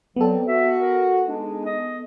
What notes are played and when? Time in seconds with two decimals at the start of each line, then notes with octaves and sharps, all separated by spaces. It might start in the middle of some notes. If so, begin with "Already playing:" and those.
0.16 F#3 B3 C4 A4 D5
0.48 F#4 E5
0.80 A#4
1.27 G#3 D4 D#4
1.65 D#5